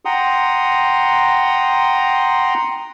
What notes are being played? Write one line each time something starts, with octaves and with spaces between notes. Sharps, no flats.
F#5 G5 A#5 C6 D#6